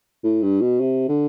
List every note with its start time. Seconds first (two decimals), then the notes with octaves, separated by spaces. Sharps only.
0.24 A2
0.42 G2
0.61 B2
0.80 C3
1.08 D3